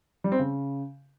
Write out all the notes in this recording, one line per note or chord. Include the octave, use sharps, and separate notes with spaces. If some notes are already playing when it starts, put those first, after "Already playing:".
G3
C4
C#3